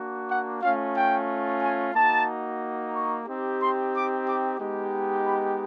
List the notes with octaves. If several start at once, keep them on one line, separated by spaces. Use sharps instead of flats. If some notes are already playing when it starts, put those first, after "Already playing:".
Already playing: A#3 D4 F#4
F#5
A3 C#4 F4 F5
G5
G#5
A#3 D#4 F#4 A5
C#6
C4 D#4 G4
C6
D6
D6
G#3 B3 D#4 G4
B5